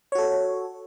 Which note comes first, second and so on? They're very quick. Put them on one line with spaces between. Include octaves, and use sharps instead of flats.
C#5 F#4 A4